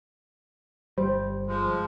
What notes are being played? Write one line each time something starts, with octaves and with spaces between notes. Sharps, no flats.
G1 G3 C5
F3 G#3